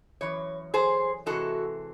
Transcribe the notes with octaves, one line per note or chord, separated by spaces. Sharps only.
F#2 E3 C#5
G#4 C5
C3 E3 G#3 F#4 A4